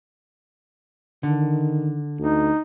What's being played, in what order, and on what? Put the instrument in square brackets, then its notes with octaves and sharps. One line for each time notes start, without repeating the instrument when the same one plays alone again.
[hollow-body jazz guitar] D3 [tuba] D#3
[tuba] D2 [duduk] D#4